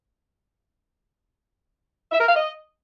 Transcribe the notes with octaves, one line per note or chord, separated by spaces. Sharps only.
E5
A#4
F5
D#5